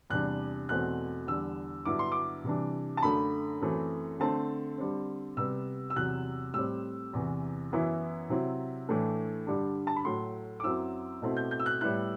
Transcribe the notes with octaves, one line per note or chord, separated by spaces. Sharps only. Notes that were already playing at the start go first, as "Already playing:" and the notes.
E2 C3 G3 D4 F#6
E2 B2 A3 C4 F#6
E2 D3 G3 E6
G2 D3 F#3 B3 E4 D6
C6
D6
C3 E3 G3 D4
A5
F#2 D3 A3 D4 B5
F#2 E3 A3 C4
D3 A3 C4 A5
D3 G3 C4
C3 G3 B3 E6
E6
E2 C3 F#3 F#6
A2 G3 C4 E6
E2 C3 E3
F#2 E3 B3 E4
C3 F#3 C4 E4
A2 E3 A3 D4
G2 D3 G3 D4
A5
B5
A2 F#3 A3 C6
D6
F#2 F#3 C4 E4 E6
B2 A3 C4 E4
G6
G6
E6
F#6
A2 G3 B3 E4 F#6